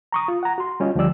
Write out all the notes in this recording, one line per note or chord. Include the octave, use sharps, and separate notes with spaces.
A#5 C#6 D#6
F4
F#5 A#5
F#4 C6
G3 C#4 F4 D#5
D2 F3 G3 G4 D5 E6